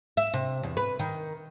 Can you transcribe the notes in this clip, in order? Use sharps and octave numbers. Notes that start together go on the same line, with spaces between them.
E5
C3
E2
B4
D#3